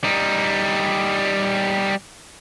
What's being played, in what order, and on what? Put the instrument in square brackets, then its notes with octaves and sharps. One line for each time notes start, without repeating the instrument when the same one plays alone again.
[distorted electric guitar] G3 D#4